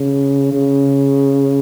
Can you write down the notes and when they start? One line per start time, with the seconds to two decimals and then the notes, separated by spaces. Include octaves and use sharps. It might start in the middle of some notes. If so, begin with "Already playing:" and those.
Already playing: C#3
0.53 C#3